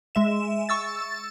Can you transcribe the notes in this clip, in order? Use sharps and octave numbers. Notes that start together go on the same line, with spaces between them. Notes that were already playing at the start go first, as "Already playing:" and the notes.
G#3 E5 E7
C#6 E6 A6